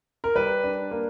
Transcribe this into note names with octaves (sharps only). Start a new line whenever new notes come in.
A#4
G3 B4
D4
A#3